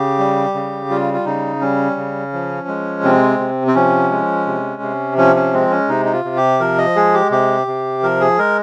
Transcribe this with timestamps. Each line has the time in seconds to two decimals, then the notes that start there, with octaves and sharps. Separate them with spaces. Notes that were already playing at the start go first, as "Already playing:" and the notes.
Already playing: C#3 G4
0.19 G3
0.54 C#3
0.90 G3 F4
1.14 F4
1.26 C#3 D#4
1.61 G3 C#4
1.97 C#3
2.33 F3
2.68 G#3
3.04 C3 C4
3.39 C3
3.67 C4
3.75 F3 C#4
4.11 G#3
4.47 C3
4.82 C3
5.18 F3 C#4
5.36 C#4
5.53 G#3 C4
5.72 C#4
5.89 C3 D#4
6.06 D#4
6.13 F4
6.25 C3
6.36 G4
6.60 F3 A#4
6.78 D#5
6.96 G#3 G#4
7.14 G4
7.31 C3 G4
7.67 C3
8.03 F3 A#4
8.21 G#4
8.38 G#3 A#4